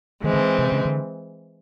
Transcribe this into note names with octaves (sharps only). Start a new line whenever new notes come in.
D#3 E3 G#3 C4
D3
C3
C#3
D3